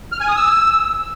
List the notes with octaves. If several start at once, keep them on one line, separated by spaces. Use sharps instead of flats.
F6
G#5
D#6
E6